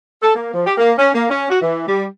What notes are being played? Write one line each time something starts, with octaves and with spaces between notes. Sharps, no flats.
A4
A#3
F3
G4
A#3
C#4
A#3
C#4
F#4
E3
G3